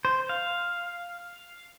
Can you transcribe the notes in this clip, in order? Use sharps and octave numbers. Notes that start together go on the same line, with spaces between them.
C5
F5